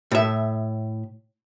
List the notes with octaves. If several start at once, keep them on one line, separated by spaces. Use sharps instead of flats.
A2 E5